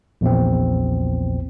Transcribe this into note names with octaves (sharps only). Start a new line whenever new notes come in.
A#1 E2 A#2 C4